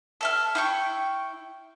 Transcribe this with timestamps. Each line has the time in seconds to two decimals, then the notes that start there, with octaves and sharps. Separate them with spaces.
0.21 A4 E5 F6
0.55 E4 G5 C#6